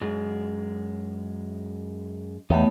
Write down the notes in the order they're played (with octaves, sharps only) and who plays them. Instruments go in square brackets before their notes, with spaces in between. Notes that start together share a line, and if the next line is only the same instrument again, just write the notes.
[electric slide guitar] F#2 G#3
[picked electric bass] E2 [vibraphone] A3 B3 C#5 [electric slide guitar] D#4 G4